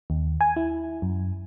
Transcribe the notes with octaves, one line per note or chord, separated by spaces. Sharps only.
D#2
G#5
E4
F#2